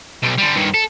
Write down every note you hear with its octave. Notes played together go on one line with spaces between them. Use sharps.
B1
D3 G3
G2 D#3
A4